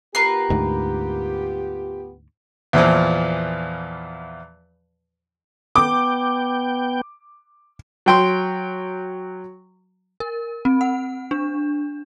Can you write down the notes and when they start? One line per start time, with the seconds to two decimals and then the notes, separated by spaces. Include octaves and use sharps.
0.15 B3 F4 G4 A#4 B4 C7
0.50 D2 G#2
2.73 E2 A#2 E3 F3
5.76 B3 G5 D6
8.06 F#3 G5 C6
10.20 A#4
10.65 C4
10.81 F#5
11.31 D4